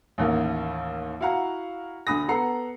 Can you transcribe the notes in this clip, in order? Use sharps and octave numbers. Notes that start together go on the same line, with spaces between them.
A1 D#2 A#3
E4 F#4 F5 F#5 A#5
D2 D3 B5 D#6 A#6
B3 A4 F#5 A#5 C7